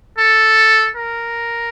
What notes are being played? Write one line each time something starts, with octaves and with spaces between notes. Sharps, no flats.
A4
A#4